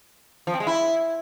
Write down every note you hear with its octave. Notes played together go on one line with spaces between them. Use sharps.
F3
C4
G#3
E4